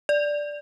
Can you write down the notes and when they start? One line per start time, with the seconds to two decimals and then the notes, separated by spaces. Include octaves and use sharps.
0.09 D5